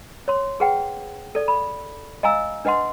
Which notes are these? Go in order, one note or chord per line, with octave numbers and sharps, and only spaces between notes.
C#5 C6
G#4 B4 F#5 G5
A4 D5
B5
D#5 F5 G#5 A#5 E6
D4 B4 D#5 F#5 C6